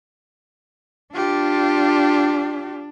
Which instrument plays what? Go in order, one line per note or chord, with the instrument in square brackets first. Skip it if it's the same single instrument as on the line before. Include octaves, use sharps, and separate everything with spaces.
[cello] D4 [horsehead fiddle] F4 G4